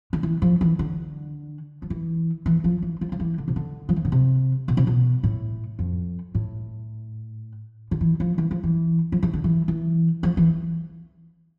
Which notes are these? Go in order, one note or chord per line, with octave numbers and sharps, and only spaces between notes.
D3
E3
F3
E3
D3
F3
E3
E3
F3
E3
F3
F3
E3
D3
C3
D3
F3
E3
D3
C3
B2
C3
B2
A2
F2
A2
D3
E3
F3
E3
F3
E3
F3
E3
D3
E3
E3
F3
E3